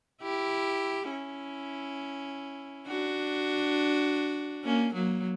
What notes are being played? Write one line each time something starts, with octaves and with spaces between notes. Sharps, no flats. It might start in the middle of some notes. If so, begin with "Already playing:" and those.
E4 G4
C#4 E4
D4 F#4
A#3 C#4
F#3 A#3